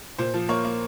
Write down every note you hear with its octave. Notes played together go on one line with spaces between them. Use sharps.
A#2 C5
F3
A#3 C#5
A#3